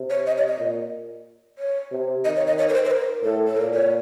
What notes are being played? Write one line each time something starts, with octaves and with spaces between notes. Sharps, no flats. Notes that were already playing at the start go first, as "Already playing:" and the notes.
Already playing: C3
C#5
D#5
C#5
D#5
A#2
C#5
C3
D#3 D#5
C#5
D#5
C#5
A#4
C5
C5
A#4
A2 A4
A4
A#2 A#4
C#5